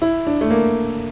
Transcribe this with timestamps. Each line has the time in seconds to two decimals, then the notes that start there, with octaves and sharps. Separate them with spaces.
0.02 E4
0.27 D4
0.41 A3
0.51 A#3